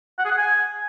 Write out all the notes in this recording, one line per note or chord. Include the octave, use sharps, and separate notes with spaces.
F#5
G#4
F#5
G#5